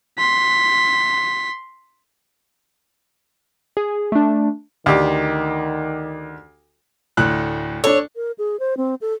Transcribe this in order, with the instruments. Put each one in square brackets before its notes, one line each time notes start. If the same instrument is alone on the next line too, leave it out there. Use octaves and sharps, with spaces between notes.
[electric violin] C6 B6
[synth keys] G#4
A3 D4
[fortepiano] D2 G4 [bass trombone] D#3
[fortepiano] D2 A2 F#6
[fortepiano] D4 A4 [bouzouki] C#5
[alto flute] A#4
G#4
C5
C4
A4